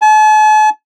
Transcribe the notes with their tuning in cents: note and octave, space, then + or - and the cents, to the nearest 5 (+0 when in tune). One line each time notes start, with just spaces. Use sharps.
A5 -45